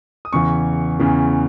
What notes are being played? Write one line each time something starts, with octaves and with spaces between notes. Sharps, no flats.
D#6
E2 C#3 E3 C#6
E2 C#3 E3